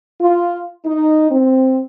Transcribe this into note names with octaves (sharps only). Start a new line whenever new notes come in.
F4
D#4
C4